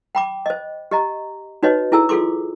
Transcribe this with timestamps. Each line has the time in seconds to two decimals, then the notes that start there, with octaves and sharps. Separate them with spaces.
0.15 G5 B5 D6
0.46 C5 D#5
0.91 G4 D#5 A#5
1.63 D#4 F#4 B4 C#5 D#5
1.92 E4 G#4 A4 G#5 A#5 E6
2.09 F4 G#4 A4 C6 D6